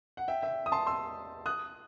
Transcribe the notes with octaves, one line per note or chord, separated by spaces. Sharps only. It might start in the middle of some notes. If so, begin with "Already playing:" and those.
F#5
E5 G5
E5 G5
D#6
A5 C6
C6 E6
D#6 F#6